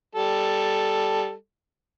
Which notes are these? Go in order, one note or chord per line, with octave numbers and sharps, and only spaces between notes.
G3 A4